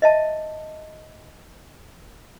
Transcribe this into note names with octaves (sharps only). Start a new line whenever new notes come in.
D#5 E5 A5